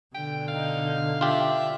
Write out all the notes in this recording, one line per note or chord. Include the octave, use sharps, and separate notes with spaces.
B2 D3 G5
D#4 F5
D4 F4 G4 E5